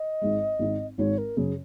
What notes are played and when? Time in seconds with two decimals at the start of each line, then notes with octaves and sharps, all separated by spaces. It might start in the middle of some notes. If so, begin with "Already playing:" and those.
Already playing: D#5
0.22 G#1 G#2 G#3
0.59 G#1 G#2 G#3 D#4
0.98 G#1 G#2 G#3 D#4 C#5
1.18 A#4
1.37 F#2 C#3 G#4